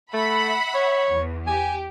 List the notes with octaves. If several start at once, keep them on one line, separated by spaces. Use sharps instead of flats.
A3 E5 F#5 B5
C#5
E2
G4 G#5